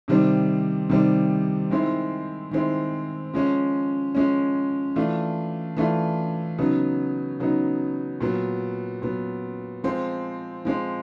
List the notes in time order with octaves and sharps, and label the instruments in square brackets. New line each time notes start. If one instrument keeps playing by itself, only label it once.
[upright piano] C3 D#3 G3 C4
C3 D#3 G3 C4
D#3 G#3 C4 E4
D#3 G#3 C4 E4
F3 G#3 C#4
F3 G#3 C#4
E3 A3 D4 F4
E3 A3 D4 F4
C#3 F#3 B3 D#4
C#3 F#3 B3 D#4
A#2 F#3 B3
A#2 F#3 B3
F3 G#3 C4
F3 G#3 C4